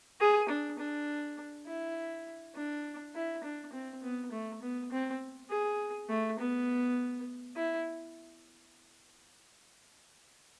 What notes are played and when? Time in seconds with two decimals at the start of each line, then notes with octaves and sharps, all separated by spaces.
0.20 G#4
0.49 D4
0.78 D4
1.67 E4
2.55 D4
3.15 E4
3.44 D4
3.73 C4
4.03 B3
4.31 A3
4.62 B3
4.92 C4
5.50 G#4
6.09 A3
6.39 B3
7.56 E4